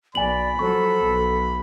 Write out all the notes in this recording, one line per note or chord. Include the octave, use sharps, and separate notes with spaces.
B1 D5 G#5 B5 F#7
F3 F#3 A4 C#6
B1